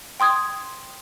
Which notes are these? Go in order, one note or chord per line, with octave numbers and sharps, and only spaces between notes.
G5 C6 D#6 G#6